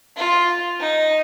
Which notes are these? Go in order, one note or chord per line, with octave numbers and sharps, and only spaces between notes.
F4
D#4